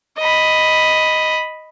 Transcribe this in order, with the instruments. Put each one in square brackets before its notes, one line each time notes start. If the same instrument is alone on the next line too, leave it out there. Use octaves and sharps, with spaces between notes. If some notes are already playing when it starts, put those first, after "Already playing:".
[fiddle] D#5 B5